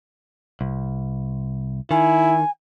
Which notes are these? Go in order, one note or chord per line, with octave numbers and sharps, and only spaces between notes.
C2
D#3 E4 G#5